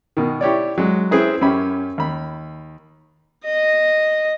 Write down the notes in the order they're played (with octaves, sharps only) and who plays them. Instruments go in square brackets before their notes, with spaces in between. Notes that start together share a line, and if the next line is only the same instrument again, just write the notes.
[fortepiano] B2 D#3
E4 G4 C#5 D5
F#3 G#3
C4 C#4 E4 G#4 B4 C5
F#2 C#4 G4 B5
D#2 B5
[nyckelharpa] D#5